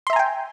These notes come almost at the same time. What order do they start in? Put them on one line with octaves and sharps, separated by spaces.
C6 E5 A#5 G#5 G5